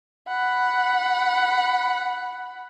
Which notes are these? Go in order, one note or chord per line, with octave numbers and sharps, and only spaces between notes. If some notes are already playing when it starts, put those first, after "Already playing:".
F#5 B5